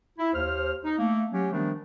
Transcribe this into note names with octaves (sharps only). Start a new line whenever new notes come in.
E4
D#2 C5 F6
D#4
A3 A#3
F#3 C#4 G4
D#3 F3 G3 A3 B3 D4